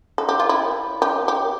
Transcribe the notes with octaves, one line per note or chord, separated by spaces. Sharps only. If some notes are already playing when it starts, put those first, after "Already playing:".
A4
G4
F4
E4
G4
G4